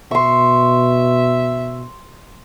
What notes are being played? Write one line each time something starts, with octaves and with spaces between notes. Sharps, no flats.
B2 E5 C6 C#6